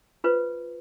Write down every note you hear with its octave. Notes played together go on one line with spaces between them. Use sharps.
F4 B4 C5